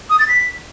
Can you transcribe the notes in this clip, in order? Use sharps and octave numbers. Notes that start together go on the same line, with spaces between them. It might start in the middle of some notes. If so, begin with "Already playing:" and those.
D#6
A6
B6